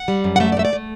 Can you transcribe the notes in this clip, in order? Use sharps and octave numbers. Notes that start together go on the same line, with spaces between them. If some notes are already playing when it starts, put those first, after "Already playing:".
Already playing: F#5
G3
F#2
F#5
A3 E5
D5
A3 E5
D5
A3